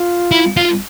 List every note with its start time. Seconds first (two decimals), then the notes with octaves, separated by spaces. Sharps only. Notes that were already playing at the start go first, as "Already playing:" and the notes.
Already playing: F4
0.31 E4
0.57 F4